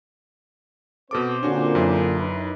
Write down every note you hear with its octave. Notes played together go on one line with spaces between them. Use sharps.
B2 C4 A4 C5 D6
A#2 D3 C#4 D4 F#4
F#2 E4
D#4 B4